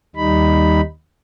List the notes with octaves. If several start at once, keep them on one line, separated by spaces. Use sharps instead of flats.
D#2 G3 D#4 B5